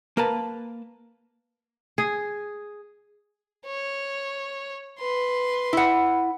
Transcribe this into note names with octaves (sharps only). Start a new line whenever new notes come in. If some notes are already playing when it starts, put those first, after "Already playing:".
A#3 A#4 B4 A5
G#4
C#5
B4 C6
E4 F#5